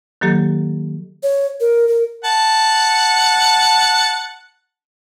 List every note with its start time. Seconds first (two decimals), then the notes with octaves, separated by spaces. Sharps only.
0.21 D#3 F#3 A#3 G4 A4
1.23 C#5
1.60 A#4
1.88 A#4
2.25 F#5 A5